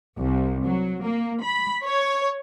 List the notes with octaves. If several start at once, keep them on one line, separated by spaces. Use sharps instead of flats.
C2
F#3
A#3
B5
C#5